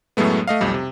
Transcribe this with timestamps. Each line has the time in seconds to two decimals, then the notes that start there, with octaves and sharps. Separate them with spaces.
0.17 F#2 A2 F#3 G#3 A3 B3
0.47 A3 D#5 F5
0.61 B1 F2 G3
0.74 C3